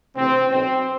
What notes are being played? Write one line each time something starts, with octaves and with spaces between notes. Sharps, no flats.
D2 C3 E3 C4
B1 B2 C4